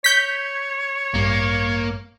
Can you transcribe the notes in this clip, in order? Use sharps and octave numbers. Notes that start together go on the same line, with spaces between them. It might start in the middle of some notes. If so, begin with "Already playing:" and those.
C#5 G6 B6
A1 G2 A#3